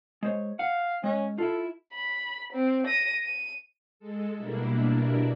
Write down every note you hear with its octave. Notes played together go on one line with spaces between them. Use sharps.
G#3 C5 C#5
F5 F#5
G#3 C#4
E4 F4 A4
B5
C4
A#6 D#7
D#7
G#3 A4
B2 G3 A#3 D4 E4